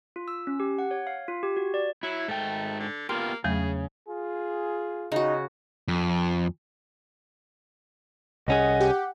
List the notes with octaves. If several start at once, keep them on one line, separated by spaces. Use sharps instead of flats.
F4
E6
C#4
G4
F#5
C#5
F5
F4
G4
F#4
D5
F#3 E4
G#2 A3 G5
D3
A#3 B3 F4 G4 C6
E2 C#3 F#3 A3 G#4
F4 G#4
C#3 D#4 F#4
F2
C2 C#4 G#4 D#5 F#5
G4